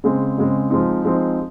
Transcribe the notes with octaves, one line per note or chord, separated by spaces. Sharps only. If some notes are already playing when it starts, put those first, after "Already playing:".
C#3 G#3 C4
C#3 G#3 C4
F3 G#3 C4 D#4
F3 G#3 C4 D#4